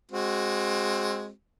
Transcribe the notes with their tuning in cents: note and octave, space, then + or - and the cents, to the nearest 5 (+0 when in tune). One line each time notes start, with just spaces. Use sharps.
G#3 +0 C4 +20 F#4 +0